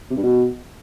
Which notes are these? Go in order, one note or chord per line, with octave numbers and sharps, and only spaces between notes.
C3
G2
B2